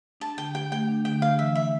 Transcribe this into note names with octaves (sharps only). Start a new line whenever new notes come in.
D4 A5
D3 G5
G4 G5
A3 G5
D4
D3 G5
D4 F5
E3 E5
E3 E5